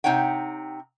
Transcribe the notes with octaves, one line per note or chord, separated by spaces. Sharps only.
C3 D#4 C#5 F#5 G5